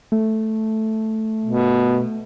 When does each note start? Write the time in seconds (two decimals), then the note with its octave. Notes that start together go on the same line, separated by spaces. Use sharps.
0.12 A3
1.45 B2